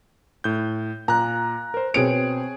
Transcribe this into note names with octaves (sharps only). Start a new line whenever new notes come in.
A2 G6
A#2 A#5 F#6
A#4 C5
B2 C4 G#4 C#5 D7